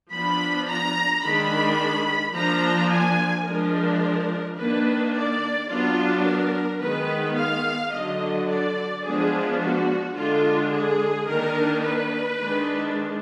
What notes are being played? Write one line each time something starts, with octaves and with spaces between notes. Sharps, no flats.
F3 B3 D4 B5
A#5
D#3 G#3 D4 B5
F3 A#3 D4 A#5
G#5
F3 G#3 D4 A#4
D#3 A#3 D4 B4
D5
F#3 B3 D4 F4
A#4
D#3 G#3 B3 B4
F5
D3 F#3 D4 D#5
D5
F3 G#3 B3 D4 G#4
F#4
D3 G#3 D4 F4
G#4
D#3 A#3 D4 A#4
B4
D#3 G#3 D4